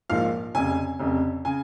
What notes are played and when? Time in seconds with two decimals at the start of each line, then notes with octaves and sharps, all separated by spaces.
0.10 A#1 G#2 F3 A#3 F5
0.55 F1 F2 C#3 G#5
0.99 F1 F2 C#3
1.45 C#3 G#5